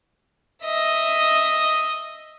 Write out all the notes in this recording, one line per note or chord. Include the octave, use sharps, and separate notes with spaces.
D#5 E5